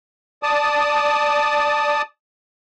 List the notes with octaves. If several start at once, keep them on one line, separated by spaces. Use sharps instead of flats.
D5 A5 D#6